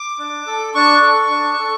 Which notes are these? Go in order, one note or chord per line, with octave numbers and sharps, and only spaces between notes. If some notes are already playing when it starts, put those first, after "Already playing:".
Already playing: D6
D4
A4
D4 C#6
A4
D4
A4